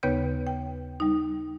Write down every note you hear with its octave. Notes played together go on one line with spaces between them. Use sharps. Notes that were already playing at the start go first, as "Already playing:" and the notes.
D#2 C#3 B3 B4 C#5 G6
G5
G3 D#4